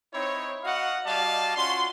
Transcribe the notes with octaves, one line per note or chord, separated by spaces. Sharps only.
C4 D#4 E4 C#5
F#4 D#5 F5 F#5
G3 F#4 D5 D#5 F5 A5
C#4 F4 F#4 C6